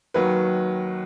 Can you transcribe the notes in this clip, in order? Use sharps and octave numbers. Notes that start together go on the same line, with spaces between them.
D#2 D#3 F#3 B4